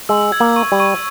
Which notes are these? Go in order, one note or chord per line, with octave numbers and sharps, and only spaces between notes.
G#3 E6
G#6
A#3
C#6
G3
C#6